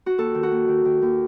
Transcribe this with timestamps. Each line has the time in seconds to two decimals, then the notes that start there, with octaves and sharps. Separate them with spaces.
0.06 F#4
0.18 D#2 A4
0.35 D#3
0.43 F#4
0.52 D#2
0.68 D#3
0.85 D#3
1.02 D#2